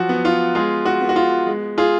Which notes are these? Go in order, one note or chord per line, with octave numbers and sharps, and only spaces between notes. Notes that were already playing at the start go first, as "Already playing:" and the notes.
Already playing: F3 F#3 F#4
B3
F4
G#3 F4 G#4
F#4
B3
F#4
F4
G#3
F4 G#4